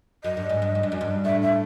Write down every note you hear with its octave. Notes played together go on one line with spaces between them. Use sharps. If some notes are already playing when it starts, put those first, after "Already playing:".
F#2 D#5
G2
G#2
G2
G#2
G2
F#2
G2
A2 E5
E5